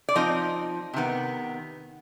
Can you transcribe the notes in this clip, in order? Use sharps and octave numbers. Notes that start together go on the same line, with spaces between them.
D5
F3 C4 D#4 D#5
C3 D#3 B3